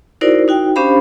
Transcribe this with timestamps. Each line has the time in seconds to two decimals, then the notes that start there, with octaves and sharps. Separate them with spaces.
0.21 D#4 E4 F#4 A#4 C5 D5
0.48 D#4 F#4 G5
0.76 C#4 D4 G4 C5 F5 B5